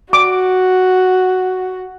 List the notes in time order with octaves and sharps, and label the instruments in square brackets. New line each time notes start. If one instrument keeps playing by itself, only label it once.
[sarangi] F#4 [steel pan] D6